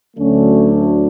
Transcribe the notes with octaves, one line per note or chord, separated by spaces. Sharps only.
D2 D3 F#3 A3 C#4